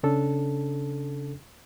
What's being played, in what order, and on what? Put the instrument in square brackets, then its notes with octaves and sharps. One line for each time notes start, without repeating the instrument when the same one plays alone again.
[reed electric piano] C#3 C#4 D4 A4